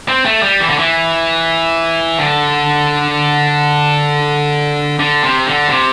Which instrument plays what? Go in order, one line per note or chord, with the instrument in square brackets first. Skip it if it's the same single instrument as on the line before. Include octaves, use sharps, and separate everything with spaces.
[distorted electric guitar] C4
A3
G3
E3
D3
E3
D3
D3
C3
D3
C3